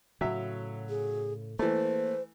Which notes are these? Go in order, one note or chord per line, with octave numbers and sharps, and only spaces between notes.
A2 C#3 F#3 E5
G#4
E3 A3 A#3 C5